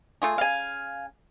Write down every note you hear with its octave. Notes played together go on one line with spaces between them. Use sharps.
A3 F4 G#4
C#3 F5 G#5